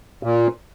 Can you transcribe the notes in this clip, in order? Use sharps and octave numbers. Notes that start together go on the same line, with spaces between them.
A#2